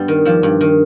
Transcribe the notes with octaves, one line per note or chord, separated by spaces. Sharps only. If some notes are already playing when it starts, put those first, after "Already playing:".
Already playing: G2 G3 B3
D#3
G2 F3
G2
D#3